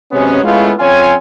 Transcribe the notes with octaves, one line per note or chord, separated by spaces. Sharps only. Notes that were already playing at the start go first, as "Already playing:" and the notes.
C3 F#3 G#3 B3 C#4
G#3 A3 B3 C#4 E4 F4
F2 C4 C#4 F4 C#5 G#5